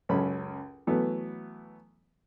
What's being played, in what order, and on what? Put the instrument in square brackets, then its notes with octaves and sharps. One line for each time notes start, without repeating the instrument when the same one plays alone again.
[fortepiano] C#2 F#2 C#4 A4 B5
E3 F#3 A3 B3